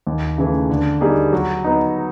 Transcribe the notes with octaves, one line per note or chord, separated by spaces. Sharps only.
D#2
C#3 E3 A3
D3
G3 A#3 D#4 G#4
F#3
B3 D#4